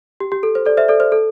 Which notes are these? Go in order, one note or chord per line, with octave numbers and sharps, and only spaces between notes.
G4
G4
A4
C5
A4 D5
C5 E5
A4 D5
C5
A4